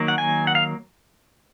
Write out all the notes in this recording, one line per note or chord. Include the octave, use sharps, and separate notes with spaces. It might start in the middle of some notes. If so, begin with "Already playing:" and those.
Already playing: D#3 F#3 A#3
F#5
G#5
F#5
F5